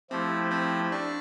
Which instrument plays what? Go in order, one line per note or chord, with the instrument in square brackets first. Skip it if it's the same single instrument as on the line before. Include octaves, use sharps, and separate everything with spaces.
[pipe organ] F3 A3 E4 G4 [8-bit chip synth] C4
[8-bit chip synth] C4
D4